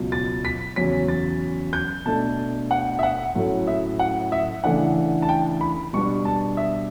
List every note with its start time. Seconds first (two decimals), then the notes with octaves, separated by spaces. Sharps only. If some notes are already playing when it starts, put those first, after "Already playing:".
Already playing: C#2 B2 F#3
0.12 A6
0.45 B6
0.76 E2 C#3 F#3 C#4 B6
1.08 A6
1.73 G6
2.06 B2 A3 D4 A5
2.71 F#5
2.99 E5
3.03 F#5
3.35 A2 F#3 A3 C#4
3.67 E5
3.99 F#5
4.32 E5
4.64 C#3 E3 A3 D4 F#5
5.22 A5
5.29 G5
5.61 B5
5.93 B2 G3 B3 D4 C#6
6.25 A5
6.57 E5